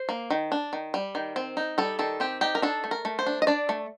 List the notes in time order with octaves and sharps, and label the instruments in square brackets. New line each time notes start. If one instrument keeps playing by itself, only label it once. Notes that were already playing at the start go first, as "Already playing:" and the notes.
Already playing: [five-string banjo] C5
A#3
D#3
D4
D#3
G3
D#3
C4
D#4
G3 A4
D#3 A4
C4 G4
D#4 G4
A#4
D4 A4
A3
A#4
A3
C5
D4
D#5
D4 D5
A3